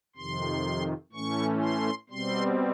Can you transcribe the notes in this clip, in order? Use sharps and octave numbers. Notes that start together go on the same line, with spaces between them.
F2 C3 D#3 C6
A2 E3 A3 C#4 C#6
C6
B2 G3 C4 C6